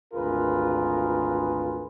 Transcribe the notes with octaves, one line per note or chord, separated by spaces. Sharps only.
G#1 D2 F4 G#4 A#4 B4